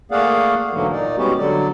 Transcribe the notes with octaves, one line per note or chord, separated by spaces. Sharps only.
A3 A#3 G#4 D5 F5 F#5
G#2 D3 E3 F#3 A3 A#3
A#2 D#4 D5
G3 G#3 B3 C#4 F#4 G4
D3 F#3 D5